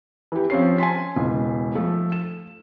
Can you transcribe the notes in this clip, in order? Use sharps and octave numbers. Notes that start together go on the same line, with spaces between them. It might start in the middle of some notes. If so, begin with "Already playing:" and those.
E3 G4
F3 C4 C#4 C#5 C7
G#5 A5 C6 B6
E1 C#2
F3 A3
E7